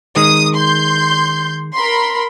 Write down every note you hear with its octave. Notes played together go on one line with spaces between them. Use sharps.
D#3 G#3 D#6
C6 G6
A#4 B5 C6